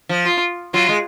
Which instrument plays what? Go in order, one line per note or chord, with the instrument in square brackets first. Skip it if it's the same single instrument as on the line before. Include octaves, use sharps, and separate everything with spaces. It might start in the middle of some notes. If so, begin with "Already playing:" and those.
[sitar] F3
[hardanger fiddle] F4
[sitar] F#3 [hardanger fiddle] F4
[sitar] G#3